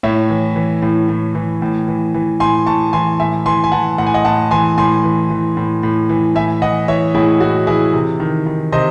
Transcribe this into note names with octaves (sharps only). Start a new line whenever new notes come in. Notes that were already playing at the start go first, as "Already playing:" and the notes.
A2 C#5 E5
E3
E3
A2
A2
E3
A2
E3
E3
A2 G#5 C6
A2 A5 C#6
E3 G#5 C6
A2 E5 G#5
E3 G#5 C6
G#5
E3 F#5 A5
A2 F#5
G#5
D#5 F#5
A2 F#5 A5
E3 G#5 C6
A2 G#5 C6
E3
E3
A2
A2
E3
A2 E5 G#5
E3 D#5 F#5
E3 C#5 E5
A2 E4 G#4
A2 F#4
E3 E4 G#4
C3
D#3
D#3
C3 C5 D#5